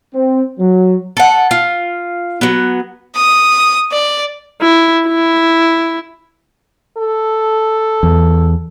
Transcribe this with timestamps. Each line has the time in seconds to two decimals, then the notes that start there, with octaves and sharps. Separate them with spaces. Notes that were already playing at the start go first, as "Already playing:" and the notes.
0.14 C4
0.59 F#3
1.17 A4 F#5
1.51 F4
2.41 F#3 B3
3.16 D#6
3.92 D5
4.62 E4
5.07 E4
6.97 A4
8.03 E2